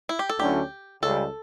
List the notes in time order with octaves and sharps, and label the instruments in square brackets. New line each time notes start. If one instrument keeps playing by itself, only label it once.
[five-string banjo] E4
G4
A4
[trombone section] D2 D3 F#3 C#4 E4 [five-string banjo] G4
[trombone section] C#2 C#3 G3 [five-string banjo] A4